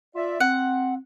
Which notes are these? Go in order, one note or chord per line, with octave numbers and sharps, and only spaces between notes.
F4 D5 E5
C4 F#5